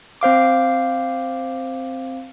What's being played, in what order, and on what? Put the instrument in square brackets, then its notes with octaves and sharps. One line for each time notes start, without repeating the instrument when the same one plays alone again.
[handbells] C4 C5 F5 D6